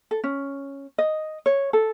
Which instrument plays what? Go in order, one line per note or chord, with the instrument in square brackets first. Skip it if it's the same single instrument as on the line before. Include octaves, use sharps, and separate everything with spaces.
[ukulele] A4
C#4
D#5
C#5
A4